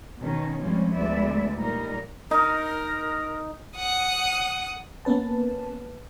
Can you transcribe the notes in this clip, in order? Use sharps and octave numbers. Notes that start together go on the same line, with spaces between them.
B2 D#3 C#4
G2 F3 G3 G#3 C4 C#4
D2 G#3 B3 D5 E5
A#2 G3 D#4 A#4
D#4 A#4
F#5 D#6
A#3 B3 C#4 B4 A5